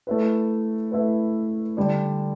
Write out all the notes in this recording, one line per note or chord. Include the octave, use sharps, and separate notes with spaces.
A3 E4 B4
A3 E4 B4
D3 G3 D4